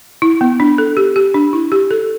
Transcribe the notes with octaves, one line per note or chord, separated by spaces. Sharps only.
E4
B3
D4
A4
G4
G4
D4
E4
G4
A4